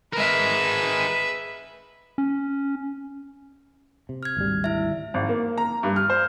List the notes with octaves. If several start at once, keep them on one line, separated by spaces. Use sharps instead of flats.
G#3 A#4 B4 E5
C#4
C3
F6 G#6
G#1 D2 G3
E4 E5
G#1
A#3
A#5
G2
F6
C5